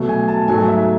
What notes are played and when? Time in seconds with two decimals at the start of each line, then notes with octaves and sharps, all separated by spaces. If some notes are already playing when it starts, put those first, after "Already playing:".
Already playing: B2 F#3 A3
0.09 G#5
0.28 A5
0.48 G#2 F#3 A3 G#5
0.68 E5